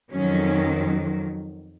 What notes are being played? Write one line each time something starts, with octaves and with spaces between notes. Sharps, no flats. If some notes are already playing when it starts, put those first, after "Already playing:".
F2 D#3 F#3 C#4